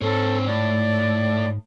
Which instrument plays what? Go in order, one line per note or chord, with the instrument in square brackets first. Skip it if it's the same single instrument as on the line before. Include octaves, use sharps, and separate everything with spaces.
[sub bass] G#2 [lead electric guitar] C4 C#5 [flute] A4
[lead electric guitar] A2 [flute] D5